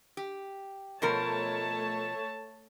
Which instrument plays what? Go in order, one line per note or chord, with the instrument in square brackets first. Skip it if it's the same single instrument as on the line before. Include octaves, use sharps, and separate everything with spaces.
[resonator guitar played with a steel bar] G4
[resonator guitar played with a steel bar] B2 F3 A#4 [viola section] A3 C#5 A5